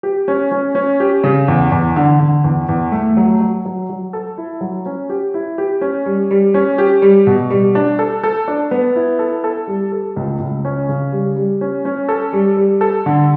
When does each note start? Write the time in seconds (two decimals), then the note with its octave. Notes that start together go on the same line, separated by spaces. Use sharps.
0.03 G4
0.28 C#4
0.52 C#4
0.75 C#4
1.00 G4
1.24 C#3
1.48 E2
1.72 E2
1.96 D3
2.20 D3
2.44 E2
2.69 E2
2.92 A3
3.17 F#3
3.41 F#3
3.65 F#3
3.90 F#3
4.13 A4
4.38 E4
4.61 F#3
4.86 C#4
5.10 G4
5.34 E4
5.58 G4
5.81 C#4
6.06 G3
6.31 G3
6.54 C#4
6.78 G4
7.02 G3
7.27 B2
7.50 G3
7.75 D4
7.99 A4
8.23 A4
8.48 D4
8.71 B3
8.96 E4
9.19 A4
9.44 A4
9.67 G3
9.92 A4
10.16 C#2
10.40 C#2
10.65 C#4
10.89 C#3
11.12 G3
11.36 G3
11.61 C#4
11.85 C#4
12.09 A4
12.33 G3
12.57 G3
12.81 A4
13.06 D3